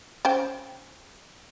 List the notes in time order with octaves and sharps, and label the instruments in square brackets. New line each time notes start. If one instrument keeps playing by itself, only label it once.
[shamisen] C#4 C5 G5